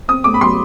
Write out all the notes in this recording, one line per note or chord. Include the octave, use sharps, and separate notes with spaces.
C4 D#6
A3 D6
B5
F#3 C6